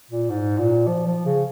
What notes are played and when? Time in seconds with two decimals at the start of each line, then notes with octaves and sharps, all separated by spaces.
0.11 A#2
0.30 G#2
0.59 A#2
0.87 F3
1.07 F3
1.26 C#3